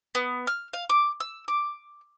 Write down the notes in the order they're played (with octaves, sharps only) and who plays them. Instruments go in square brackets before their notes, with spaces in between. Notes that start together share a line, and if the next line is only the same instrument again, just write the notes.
[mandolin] B3
F6
F5
D6
E6
D6